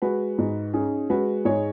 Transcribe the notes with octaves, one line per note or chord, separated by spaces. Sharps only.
G#3 F#4 B4
G#2
C#4 D#4 G#4
G#3 F#4 B4
G#2 G#4 C#5